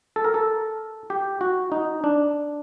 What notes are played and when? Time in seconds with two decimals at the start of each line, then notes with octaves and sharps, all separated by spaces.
0.16 A4
0.24 A#4
0.34 A4
1.10 G4
1.41 F#4
1.72 D#4
2.04 D4